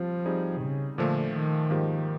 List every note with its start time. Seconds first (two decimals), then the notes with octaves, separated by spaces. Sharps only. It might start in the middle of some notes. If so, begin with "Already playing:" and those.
Already playing: F3 G3 C4 F4
0.25 G3 C4 D#4 G#4
0.62 C#3
0.98 A#2 D3 F3 A3
1.34 D#3
1.70 G#2 F3 A#3 D#4 G4